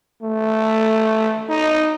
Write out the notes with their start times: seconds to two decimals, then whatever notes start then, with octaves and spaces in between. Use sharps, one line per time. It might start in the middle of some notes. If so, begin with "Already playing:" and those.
0.22 A3
1.49 D#4